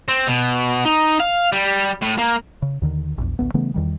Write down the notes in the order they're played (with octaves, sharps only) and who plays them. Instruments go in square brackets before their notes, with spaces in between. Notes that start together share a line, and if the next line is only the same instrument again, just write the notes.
[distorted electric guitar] C4
B2
D#4
F5
G3
A2
A#3
[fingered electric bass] C#3
D#2 D3 D#3
A#1 E2
A1 D2 B3
C#3 E3 A3 B3
E2 D#3 G3